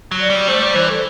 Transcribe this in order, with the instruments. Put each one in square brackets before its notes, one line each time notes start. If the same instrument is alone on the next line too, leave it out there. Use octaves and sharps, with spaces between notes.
[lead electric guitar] F#3
[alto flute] D5
[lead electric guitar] G3
[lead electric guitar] A3 [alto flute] C5
[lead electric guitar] G3 [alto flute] D5
[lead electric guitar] E3 [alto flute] C5
[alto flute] A4